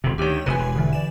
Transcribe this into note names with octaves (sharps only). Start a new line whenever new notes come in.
D#1 C3
D2 D#3 G4 C#5
F1 C3 B4 G#5
E1
D3 E3
D5 E7